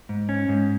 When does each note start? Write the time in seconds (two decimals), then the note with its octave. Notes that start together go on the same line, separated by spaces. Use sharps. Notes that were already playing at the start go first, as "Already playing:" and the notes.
0.09 G#2
0.29 C#4
0.49 G#2